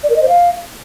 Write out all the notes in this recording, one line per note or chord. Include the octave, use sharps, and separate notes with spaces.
D5
A#4
D#5
C5
F5